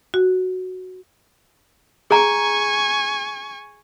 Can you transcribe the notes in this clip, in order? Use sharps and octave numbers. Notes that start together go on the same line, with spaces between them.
F#4
G#4 G#5 A#5 C#6